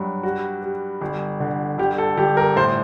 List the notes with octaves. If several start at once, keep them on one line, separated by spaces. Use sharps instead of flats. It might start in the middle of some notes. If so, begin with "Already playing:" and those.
Already playing: G2 F#3
G3 F#4
G3
G1
D3
G1 G4
A4
G1 G4
A#4
A2 C5